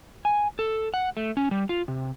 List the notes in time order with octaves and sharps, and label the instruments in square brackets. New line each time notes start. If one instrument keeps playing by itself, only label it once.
[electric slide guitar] G#5
A4
F#5
A3
C#4
G3
F4
C3